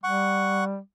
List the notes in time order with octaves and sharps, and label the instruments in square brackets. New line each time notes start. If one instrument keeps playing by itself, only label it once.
[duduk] G3 [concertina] F#5 C#6